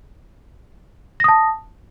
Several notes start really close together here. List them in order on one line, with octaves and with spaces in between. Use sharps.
A#6 D#6 A5